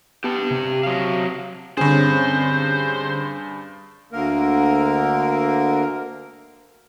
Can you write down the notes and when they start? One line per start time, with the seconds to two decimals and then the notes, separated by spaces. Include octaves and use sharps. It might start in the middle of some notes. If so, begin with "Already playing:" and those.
0.24 B3 G4 A5
0.51 C3
0.83 F#3 F5
1.77 G2 D3 C4 C#4 G#4 C5
4.13 D2 D3 A#3 A#4